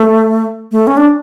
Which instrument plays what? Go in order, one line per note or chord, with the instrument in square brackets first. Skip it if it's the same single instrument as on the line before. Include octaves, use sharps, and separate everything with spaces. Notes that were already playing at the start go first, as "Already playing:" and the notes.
Already playing: [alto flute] A3
A3
C#4
D4